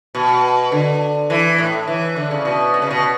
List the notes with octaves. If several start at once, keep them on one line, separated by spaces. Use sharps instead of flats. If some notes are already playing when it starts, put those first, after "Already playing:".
B2
D3
E3
A2
E3
D3
C#3
B2
B2
C#3
B2